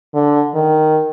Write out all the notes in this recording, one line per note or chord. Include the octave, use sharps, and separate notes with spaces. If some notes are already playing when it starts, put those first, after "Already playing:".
D3
D#3